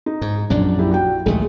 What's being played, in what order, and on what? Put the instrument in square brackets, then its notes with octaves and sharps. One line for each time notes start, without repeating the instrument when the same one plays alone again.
[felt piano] D#4
[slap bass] G#2
[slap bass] A#1 F#2 A#2 [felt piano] D4
[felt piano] E4 G4
F#4 G5
[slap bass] A#1 D#2 A3 [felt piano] G#3